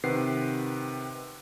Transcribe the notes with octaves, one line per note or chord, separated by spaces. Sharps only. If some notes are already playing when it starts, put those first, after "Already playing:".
C3 D#3 B4 F#5 C7